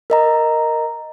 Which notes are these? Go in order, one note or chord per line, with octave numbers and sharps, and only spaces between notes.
A#4 D#5 A#5